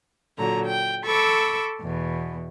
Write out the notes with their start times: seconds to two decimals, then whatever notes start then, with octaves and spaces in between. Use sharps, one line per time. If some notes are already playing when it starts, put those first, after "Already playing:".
0.38 A#2 D3 F#3 A#5
0.67 G5
1.04 A4 B5 C#6 D6 E6
1.81 E2 B2